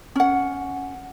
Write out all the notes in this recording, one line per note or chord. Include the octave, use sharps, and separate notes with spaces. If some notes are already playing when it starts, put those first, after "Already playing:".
C#4 F#5